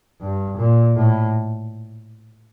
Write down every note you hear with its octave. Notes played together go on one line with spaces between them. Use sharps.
G2
A#2
A2